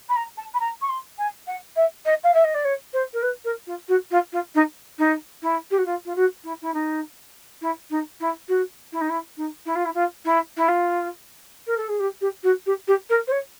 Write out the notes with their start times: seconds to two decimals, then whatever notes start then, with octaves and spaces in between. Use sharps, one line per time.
0.09 B5
0.16 A#5
0.37 A5
0.54 B5
0.60 A#5
0.81 C#6
0.89 C6
1.18 G#5
1.47 F#5
1.76 E5
2.05 D#5
2.23 F5
2.34 E5
2.44 D#5
2.54 D5
2.64 C#5
2.93 C5
3.13 A#4
3.22 B4
3.44 A#4
3.67 F4
3.88 F#4
4.11 F4
4.32 F4
4.55 D#4
4.98 D#4
5.42 E4
5.71 G4
5.78 F#4
5.85 F4
6.05 F4
6.15 F#4
6.44 E4
6.62 E4
6.74 D#4
7.61 E4
7.90 D#4
8.20 E4
8.48 F#4
8.92 E4
9.01 D#4
9.09 E4
9.37 D#4
9.66 E4
9.75 F4
9.85 E4
9.94 F4
10.25 E4
10.57 E4
10.68 F4
11.67 A#4
11.77 A4
11.88 G#4
11.99 G4
12.21 G4
12.43 F#4
12.66 G4
12.87 G4
13.09 A#4
13.27 C5
13.31 C#5